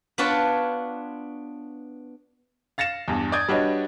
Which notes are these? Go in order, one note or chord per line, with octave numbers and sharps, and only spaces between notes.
B3 D4 F4 B4 C#5 A5
F5 A6 A#6 C#7 E7
E2 G2
D5 D#6 G6 G#6
G3 D4 F#4 B4 C#5 D#5